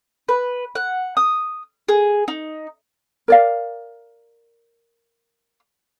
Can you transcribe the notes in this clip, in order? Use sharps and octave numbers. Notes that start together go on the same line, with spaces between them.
B4
F#5
D#6
G#4
D#4
A#4 D5 F5